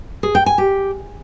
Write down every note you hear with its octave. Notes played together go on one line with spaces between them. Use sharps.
G#4
G5
G#5
G4